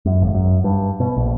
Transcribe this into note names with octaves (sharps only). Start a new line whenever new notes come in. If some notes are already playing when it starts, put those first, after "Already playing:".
F#2
G#1
F#2
G2
B2
A#1